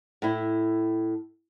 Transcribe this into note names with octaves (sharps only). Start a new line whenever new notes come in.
A2 E4